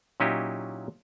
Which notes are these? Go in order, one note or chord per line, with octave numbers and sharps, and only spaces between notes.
A#2 F#3 C#4 D#4 E4 G4